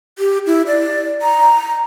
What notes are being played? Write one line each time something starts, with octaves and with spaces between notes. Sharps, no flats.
G4
E4
D5
A#5